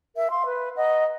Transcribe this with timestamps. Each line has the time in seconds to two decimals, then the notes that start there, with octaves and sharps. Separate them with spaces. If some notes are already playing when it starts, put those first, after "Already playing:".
0.16 A#4 E5
0.30 F5 C6
0.46 B4
0.77 D#5 F#5 A#5